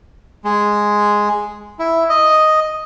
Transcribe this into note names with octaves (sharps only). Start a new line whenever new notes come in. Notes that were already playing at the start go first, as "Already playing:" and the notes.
G#3
E4
D#5